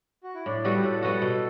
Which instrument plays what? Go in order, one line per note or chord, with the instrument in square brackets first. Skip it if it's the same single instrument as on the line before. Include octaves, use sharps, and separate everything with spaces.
[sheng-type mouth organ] F#4
E4
[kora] A2 [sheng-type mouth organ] D4
[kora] G3 B3 F#4 [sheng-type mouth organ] A4
[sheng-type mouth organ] G4
[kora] A2 [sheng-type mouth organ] A4
[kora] G3 B3 F#4
B2